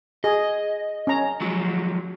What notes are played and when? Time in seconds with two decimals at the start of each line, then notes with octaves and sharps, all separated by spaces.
0.24 G#4 D#5
1.07 C#4 A#5
1.41 F3 F#3 G#3